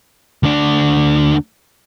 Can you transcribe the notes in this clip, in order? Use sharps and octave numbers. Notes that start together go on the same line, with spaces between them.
D2 D4